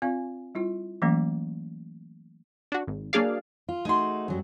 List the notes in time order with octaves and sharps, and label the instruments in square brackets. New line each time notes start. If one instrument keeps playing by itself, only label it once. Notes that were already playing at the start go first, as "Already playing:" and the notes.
[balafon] C4 F4 D5 F5 G#5 C#6
G3 E4 F4
E3 F#3 A3 A#3 C#4
[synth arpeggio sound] D4 F#4
G#1
F#3 A#3 D4 G#4 D5 F5
[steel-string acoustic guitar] F4
[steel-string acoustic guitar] A3 D#4 F#4 [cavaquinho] G#4 C6
[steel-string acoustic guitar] F#2 F#3 G3